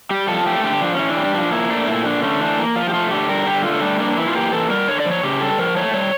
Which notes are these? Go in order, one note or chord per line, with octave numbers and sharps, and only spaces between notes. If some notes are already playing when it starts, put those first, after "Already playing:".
G3 G4
F3 A4
A3 G4
D3 G4
F3 D4
E3 C#4
D4
G3
F3 D4
A#3 E4
A3 D4
A#2 E4
D3 D4
A3 C#4
E3 D4
A#3
F3 F4
G4
A3 F4
D3 G4
G3 A#4
D3 G4
A3 F4
G3 D4
A#3 D4
E3 E4
F4
A#3 G4
E3 A4
G3 A#4
D3 C#5
D5
F3
C#5
C#3 G4
G3 A4
F3 A#4
A3 C#5
G3 C#5